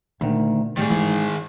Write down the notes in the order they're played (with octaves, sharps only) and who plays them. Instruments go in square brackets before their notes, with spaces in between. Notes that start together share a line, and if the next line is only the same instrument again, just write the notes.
[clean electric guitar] D2 D#3 [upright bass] A#2
[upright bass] A2 [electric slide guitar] D#3 G#4 [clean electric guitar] G3
[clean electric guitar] G#2 [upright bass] E3